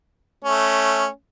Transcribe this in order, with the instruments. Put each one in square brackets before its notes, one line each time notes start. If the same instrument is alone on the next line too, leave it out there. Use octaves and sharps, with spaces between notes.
[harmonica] A3 C#4